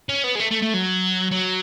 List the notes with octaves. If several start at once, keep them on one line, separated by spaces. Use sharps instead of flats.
C#4
B3
G#3
A3
A3
A3
F#3
F#3